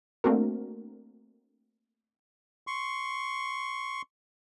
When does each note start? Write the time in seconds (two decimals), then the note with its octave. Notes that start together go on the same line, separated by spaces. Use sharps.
0.24 A3 A#3 C4 D4 F#4 A#4
2.67 C6 C#6